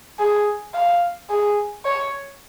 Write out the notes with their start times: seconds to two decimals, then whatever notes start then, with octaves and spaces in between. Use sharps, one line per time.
0.19 G#4
0.74 F5
1.30 G#4
1.85 C#5